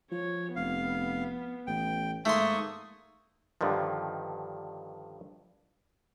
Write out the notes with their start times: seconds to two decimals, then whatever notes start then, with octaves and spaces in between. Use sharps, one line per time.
0.11 F3 C#5
0.56 F1 B3 F5
1.67 A1 G5
2.25 G#2 A3 A#3 C6 C#6 D#6
3.61 G2 D3 D#3 F3